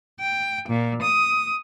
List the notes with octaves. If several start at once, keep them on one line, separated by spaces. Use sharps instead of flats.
G5
A#2
D#6